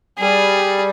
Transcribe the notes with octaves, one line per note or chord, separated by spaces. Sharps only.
G3 G#4